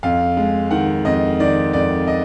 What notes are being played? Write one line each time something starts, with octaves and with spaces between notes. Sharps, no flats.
F2 F5
G#3
D#3 F#5
F2 D#5
D#3 D5
F2 D5
D#5